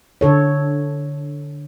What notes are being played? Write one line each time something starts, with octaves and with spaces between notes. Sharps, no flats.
D3 A4 C#5